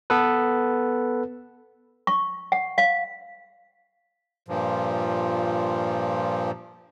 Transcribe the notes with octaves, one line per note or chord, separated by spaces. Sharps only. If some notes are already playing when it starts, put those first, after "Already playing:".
B3 A4 B4
C#6
F#5
F5
G2 A#2 F3